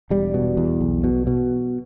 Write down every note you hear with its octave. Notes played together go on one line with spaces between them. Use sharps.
E1 G3
B2
E2
B1
B2
B2